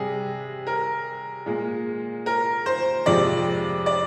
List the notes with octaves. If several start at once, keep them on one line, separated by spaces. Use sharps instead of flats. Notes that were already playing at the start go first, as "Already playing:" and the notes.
Already playing: C3 G3 G#4
A#4
A#2 G#3
A#4
C5
F2 C3 F3 G#3 D5
D5